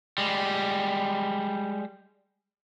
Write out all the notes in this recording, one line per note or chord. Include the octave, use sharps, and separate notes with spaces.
G3 G#3